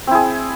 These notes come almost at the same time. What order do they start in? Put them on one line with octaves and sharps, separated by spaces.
C4 E4 G#4